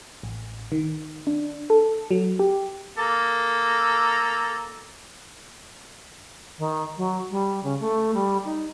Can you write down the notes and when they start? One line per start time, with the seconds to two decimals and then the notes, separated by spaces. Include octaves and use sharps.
0.23 A1
0.72 D#3
1.27 D4
1.70 A4
2.11 F#3
2.39 G4
2.98 A#3 A4 A#5
6.58 D#3
6.97 F#3
7.31 G3
7.63 C#3
7.80 A3
8.14 G3
8.45 D#4